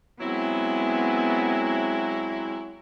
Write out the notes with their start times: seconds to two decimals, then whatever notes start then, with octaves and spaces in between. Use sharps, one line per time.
0.21 F#3 G#3 B3 C4 E4